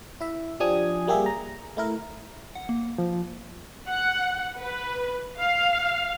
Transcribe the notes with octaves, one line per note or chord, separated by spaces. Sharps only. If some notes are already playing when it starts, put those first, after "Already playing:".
E4 E5
F3 D4 G4 G#5 D#6 G#6
G3 A#3 G4 G#4 E5
A#5
A3 E4 A#4
F#5
A#3
F3
F#5
B4
F5